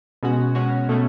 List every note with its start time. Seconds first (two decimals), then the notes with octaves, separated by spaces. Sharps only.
0.23 B2 G#3 C#4 F#4
0.55 B2 G#3 C#4 F#4
0.89 B2 A3 C#4